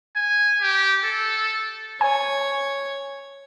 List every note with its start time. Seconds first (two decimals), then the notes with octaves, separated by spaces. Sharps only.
0.16 G#5
0.61 G4
1.04 A4
2.01 C#5 G#5